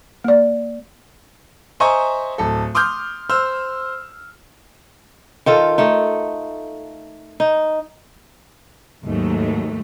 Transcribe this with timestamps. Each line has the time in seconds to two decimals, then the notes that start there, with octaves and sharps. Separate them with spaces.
0.24 A#3 D5
1.80 C5 D#5 E5 G#5 A#5 C#6
2.38 D1 A4
2.75 C6 D6 D#6 F6 G6
3.29 C5 C6 E6 F6
5.46 D#3 F4 A4
5.78 A3 D#4
7.40 D#4
9.04 D#2 G#2 F#3 A3